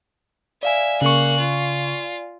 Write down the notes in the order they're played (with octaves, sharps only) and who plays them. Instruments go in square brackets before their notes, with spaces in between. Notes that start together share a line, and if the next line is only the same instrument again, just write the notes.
[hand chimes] D5 F5 G#5 [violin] E5
[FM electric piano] C#3 C#6 [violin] A#3 F#6
[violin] F4